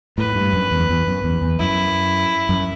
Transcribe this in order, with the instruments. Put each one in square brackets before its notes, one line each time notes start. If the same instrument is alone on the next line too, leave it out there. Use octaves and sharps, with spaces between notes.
[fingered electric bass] A2 [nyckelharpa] B4
[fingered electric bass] G2
F#2
E2
E2
F#2
E2
E2
[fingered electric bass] F#2 [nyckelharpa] E4
[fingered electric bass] F#2